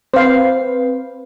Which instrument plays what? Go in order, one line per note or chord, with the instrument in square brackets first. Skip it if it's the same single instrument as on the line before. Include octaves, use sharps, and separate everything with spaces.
[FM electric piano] C4 B4 [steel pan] C5 F5